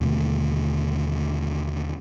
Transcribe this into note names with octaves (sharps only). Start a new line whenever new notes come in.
D#2 B2 D3 A3